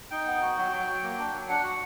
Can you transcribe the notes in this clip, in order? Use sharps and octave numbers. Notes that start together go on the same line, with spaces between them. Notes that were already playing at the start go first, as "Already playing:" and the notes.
D#4 G5
B3
F#4
F#3
F#3
F#3
A#3
D4
F#3
D4 F#5
F#4